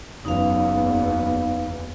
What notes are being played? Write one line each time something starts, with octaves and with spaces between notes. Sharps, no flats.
F#1 E2 B3 D#4 F5